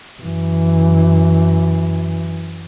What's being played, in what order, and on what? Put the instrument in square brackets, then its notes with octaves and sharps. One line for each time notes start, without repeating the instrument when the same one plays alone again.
[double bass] F#2 E3